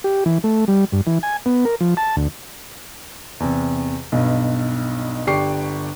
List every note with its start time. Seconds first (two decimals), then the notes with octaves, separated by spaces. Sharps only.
0.04 G4
0.26 E3
0.44 A3
0.68 G3
0.92 G2
1.07 E3
1.23 G#5
1.46 B3
1.65 A#4
1.81 F3
1.97 A5
2.17 D2
3.40 E2 C3
4.12 B1 G2 B2
5.27 G1 G4 D5 G5 C#6 C7